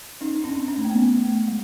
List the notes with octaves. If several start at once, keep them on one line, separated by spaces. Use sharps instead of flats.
C#4 D#4
C4 D4
D4
C#4
A3
A#3
B3
A3
G#3